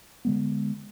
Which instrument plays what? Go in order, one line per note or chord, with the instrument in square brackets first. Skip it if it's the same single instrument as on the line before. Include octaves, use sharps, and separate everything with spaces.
[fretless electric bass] D3 G#3 B3